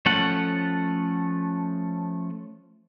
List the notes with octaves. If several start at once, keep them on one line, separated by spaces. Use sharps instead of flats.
F3 A3 C#4 A4 F#5